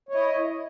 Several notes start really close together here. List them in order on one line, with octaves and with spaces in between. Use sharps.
C#5 E4 D#5